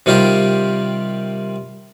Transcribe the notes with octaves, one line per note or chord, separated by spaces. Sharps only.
C3 D#3 G3 F4 G4